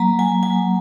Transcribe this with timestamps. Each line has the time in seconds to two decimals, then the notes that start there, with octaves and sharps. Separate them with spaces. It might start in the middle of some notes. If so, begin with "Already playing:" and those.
Already playing: F#3 A#3 A#5
0.19 F#3 G#5
0.43 F#3 G#5